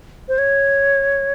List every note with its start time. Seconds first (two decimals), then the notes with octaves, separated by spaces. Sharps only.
0.28 C5
0.38 C#5